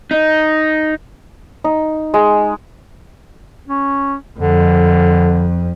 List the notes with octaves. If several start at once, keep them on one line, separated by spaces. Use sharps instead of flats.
D#4
D#4
G#3
C#4
F2 D3